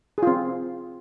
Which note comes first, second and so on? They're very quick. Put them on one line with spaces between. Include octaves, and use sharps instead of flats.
G#4 F4 C4